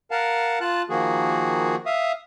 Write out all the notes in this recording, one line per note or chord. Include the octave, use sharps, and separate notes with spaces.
A#4 F5 F#5 A5
F4 A5 F#6
D#3 F3 A#3 F#4 G#4
E5 F5 D#6